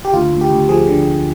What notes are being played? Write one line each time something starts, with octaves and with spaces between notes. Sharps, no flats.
G4
D2 F4
D2
G4
D2
F3 G#4
D3